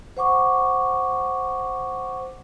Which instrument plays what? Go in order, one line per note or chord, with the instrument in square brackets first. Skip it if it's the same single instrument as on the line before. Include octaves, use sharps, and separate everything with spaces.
[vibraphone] C5 F#5 C#6 D6